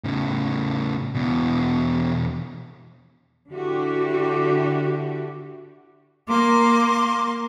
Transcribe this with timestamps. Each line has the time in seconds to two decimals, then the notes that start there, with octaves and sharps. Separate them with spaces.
0.04 A2 C#3
1.15 E2 B2
3.50 D3 D4 E4 F#4 G4
6.29 A#3 C6 D6